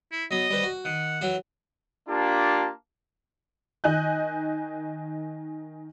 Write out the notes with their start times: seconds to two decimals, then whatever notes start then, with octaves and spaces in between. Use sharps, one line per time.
0.12 E4
0.31 F#3 B3 D#5
0.50 G3 B4 C5
0.63 F#4
0.85 D#3 F#5
1.21 E3 F#3 F#4
2.08 A#3 D4 F4 G4 A5
3.84 D#3 D#5 G#5 F#6 G6